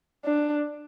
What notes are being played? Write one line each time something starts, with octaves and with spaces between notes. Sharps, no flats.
D4